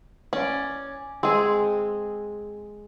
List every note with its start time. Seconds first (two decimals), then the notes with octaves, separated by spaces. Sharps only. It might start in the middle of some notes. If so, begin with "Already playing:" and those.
0.33 C#4 D5
1.23 G#3 C4 G#4